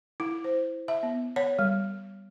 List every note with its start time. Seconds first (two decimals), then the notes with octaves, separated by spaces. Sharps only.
0.20 E4
0.44 C5
0.88 E5
1.03 B3
1.36 C#5
1.59 G3